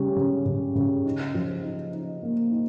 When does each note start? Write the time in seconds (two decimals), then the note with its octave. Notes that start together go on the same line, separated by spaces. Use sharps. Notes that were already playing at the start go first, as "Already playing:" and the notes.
Already playing: C#3 G3 C#4
0.16 C#3
0.46 C#3
0.75 C#3
1.05 D#4
1.34 F3
1.63 D#4
1.93 D#4
2.23 A#3
2.51 D#4